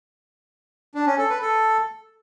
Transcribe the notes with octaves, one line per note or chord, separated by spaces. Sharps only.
D4
C#4
A4
B4
A4